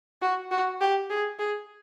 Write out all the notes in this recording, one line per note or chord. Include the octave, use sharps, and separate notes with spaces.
F#4
F#4
G4
G#4
G#4